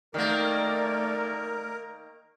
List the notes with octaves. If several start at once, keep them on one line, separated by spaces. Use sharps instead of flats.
D#3 A3 A#3 A#4 D5